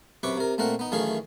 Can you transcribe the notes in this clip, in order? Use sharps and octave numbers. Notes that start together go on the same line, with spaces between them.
F#2 C3 B4 C#6 D6
C3 A#4
A#2 A3 C4 A#4 F#5
B3 D#4
F#2 D#3 E3 A3 G#4 F5